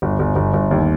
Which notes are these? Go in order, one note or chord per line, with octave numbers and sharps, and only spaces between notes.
G1
G1
G1
G1
D#2